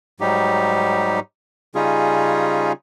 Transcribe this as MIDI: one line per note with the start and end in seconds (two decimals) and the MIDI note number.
0.20 1.20 44
0.20 1.20 54
0.20 1.20 55
0.20 1.20 63
0.20 1.20 67
1.75 2.72 49
1.75 2.72 55
1.75 2.72 61
1.75 2.72 63
1.75 2.72 65
1.75 2.72 68